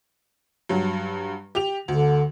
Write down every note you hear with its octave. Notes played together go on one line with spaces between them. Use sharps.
G2 F#3
G4 G5 F7
D2 D3